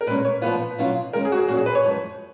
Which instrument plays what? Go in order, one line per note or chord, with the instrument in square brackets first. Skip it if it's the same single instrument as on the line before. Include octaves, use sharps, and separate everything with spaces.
[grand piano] A#4
[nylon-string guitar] A#2 G#3 C#4 [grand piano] B4
[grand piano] C#5
[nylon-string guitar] A#2 F3 B3 F4 [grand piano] B4
[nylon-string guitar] B2 F#3 C#4 F4
[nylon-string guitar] D#3 G#3 C#4 [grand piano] A#4
[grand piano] G#4
F#4
G#4
[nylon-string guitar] A#2 F#3 C#4 [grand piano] F#4
[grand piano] G#4
B4
C#5
[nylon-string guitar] F#2 F3 G#3